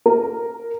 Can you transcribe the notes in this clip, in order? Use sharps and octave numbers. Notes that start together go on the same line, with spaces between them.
A#4